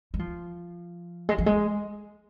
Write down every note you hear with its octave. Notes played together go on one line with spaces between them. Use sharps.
G#3
F3
G#3
F3
G#3